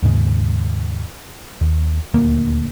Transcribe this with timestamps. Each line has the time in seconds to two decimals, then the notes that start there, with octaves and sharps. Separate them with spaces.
0.02 D#2 G#2 C#3
1.61 D#2
2.14 D#1 D2 A#3